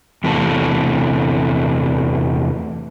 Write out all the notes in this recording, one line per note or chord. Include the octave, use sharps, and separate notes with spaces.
E2 C3 E3 A3 A5